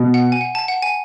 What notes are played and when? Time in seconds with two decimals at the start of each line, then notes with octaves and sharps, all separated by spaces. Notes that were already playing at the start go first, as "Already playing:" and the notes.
Already playing: B2
0.14 F#5
0.32 G#5
0.41 F#5
0.55 A5
0.68 F#5
0.82 G#5